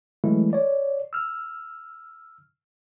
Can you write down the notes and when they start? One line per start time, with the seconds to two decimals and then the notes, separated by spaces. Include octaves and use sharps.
0.24 E3 F#3 G#3 A3 E4
0.53 C#5 D5
1.13 E6 F6